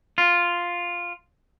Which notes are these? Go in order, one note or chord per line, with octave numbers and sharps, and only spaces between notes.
F4